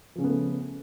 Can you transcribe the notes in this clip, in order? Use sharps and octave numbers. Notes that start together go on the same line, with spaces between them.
C#3 F3 A3 B3 C#4